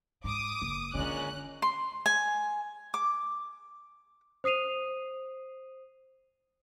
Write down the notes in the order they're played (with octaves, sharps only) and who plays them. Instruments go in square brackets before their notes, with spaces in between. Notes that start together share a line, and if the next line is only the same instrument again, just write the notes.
[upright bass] G#2 [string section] D6 D#6
[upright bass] F#1
[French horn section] A#2 G#3 C#4 [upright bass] D3 D#3 [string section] F#6
[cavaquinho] C6
G#5
D6
[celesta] C5 D#6 C7 D#7 F7